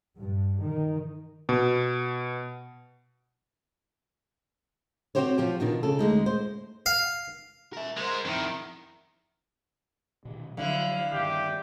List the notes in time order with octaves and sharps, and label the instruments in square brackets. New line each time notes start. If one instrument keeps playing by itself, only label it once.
[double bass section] G2
D#3
[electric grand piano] B2
[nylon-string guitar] C4 C#4 F#4 G4 C5 C#5
F3 G4
B2 D#3 D4 F#4
C#3 A4
D2 G#3 D#4
C5
[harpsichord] F5
[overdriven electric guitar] A#4 E5
[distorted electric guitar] G#3 C5 [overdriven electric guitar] A#4
[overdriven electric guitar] F2 E4 [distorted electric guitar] D#3
[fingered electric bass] B2 D#3
[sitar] D3 E4 [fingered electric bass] F3 F#3 [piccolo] F5
[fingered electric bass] G2 D#3 [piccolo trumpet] G4